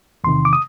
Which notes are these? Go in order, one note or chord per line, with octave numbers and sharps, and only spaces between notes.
E2 C3 D#3 C6
D6
D#6